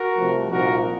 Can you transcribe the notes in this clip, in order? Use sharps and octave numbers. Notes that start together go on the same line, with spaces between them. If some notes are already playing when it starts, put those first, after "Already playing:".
Already playing: F#4 A#4
C2 C3 F3 A3
C2 A#2 F3 A#3 D#4 F#4 A#4